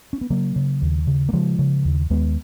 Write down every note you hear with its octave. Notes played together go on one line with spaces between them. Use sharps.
C#4
B3
C#3 F#3 A#3
C#3
D#2
C#3
A#3
C#3 F3 G#3
C#3
D#2
D#2 G#3 B3